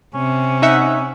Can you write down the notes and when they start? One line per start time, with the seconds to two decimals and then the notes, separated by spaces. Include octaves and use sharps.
0.14 C3 C#4
0.62 D#4 E5 F#5